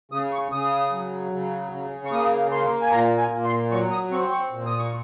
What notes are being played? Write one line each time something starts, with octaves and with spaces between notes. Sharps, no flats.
C#3 D#6
C#6
C#3 D#6
F#3
C#3
C#3
C#6
A#3 D#6
A#3 C6
G#5
A#2 A#5
G#5
A#2
C6
F#3 C#6
D#6
C4 C#6
C#6
A#2
D#6
C#6